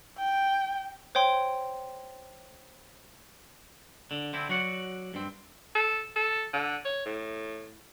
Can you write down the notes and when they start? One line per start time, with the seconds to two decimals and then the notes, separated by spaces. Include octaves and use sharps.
0.17 G5
1.15 C5 C#5 G5 C6
4.11 D3
4.33 D3 C4 E4
4.49 F#3 F#4 D5 F#5
5.14 G2 C4
5.75 A4
6.16 A4
6.53 D3
6.85 C#5
7.05 A2